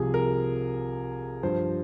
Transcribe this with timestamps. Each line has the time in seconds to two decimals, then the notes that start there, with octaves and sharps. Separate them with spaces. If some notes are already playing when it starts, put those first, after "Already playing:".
Already playing: C2 C3 F3 G#4
0.14 A#4
1.43 G2 F3 C5